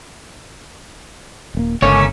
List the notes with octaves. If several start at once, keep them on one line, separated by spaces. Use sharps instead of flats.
D#1 A3 A#3
G1 C#2 A3 A#3 C#4 C#5